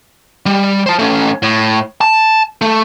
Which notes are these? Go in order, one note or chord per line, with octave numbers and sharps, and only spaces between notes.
G3
C5 A5
A3 C#4
A2
A5
A3